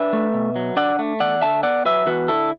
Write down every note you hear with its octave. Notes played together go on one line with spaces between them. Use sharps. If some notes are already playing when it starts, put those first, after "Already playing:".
Already playing: D4 B4 E5
A3
B2
F#3
D4 D5 F#5
A3
E2 D5 F#5
D3 E5 A5
B3 D5 F#5
F#3 B4 E5
E2 F#4 B4
D3 E4 A4